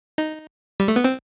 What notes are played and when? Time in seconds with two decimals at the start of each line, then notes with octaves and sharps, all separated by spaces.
0.18 D#4
0.80 G3
0.88 A3
0.96 B3
1.04 C4